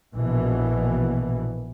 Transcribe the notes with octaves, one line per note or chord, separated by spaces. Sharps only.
A#1 B2 E3